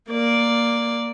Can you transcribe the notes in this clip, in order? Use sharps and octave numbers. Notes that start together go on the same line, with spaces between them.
A#3 D5